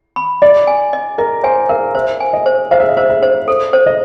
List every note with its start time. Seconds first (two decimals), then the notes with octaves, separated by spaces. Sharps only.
0.16 B5
0.42 D5 D#5
0.67 G#5
0.93 D#5
1.18 A#4 D#5
1.44 C5 G#5
1.69 A#4 F5
1.95 C5 E5
2.20 G#5
2.33 D#5
2.46 C5
2.71 C5 F5
2.80 E5
2.89 D#5
2.97 C5 E5
3.09 E5
3.23 C5
3.48 A4
3.73 C5
3.86 D#5